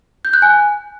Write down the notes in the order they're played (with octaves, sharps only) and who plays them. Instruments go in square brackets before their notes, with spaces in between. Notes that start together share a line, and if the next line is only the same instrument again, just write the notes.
[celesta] G6
F#6
G#5